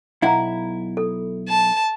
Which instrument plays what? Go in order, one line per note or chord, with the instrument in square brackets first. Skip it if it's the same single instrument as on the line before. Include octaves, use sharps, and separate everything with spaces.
[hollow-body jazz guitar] B1 E4 [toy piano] F5 F#5 A#5
[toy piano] A4
[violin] A5